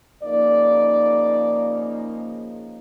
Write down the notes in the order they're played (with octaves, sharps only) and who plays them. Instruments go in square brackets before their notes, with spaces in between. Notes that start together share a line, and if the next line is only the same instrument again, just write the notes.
[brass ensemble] C#3 F3 A#3 D#4 D5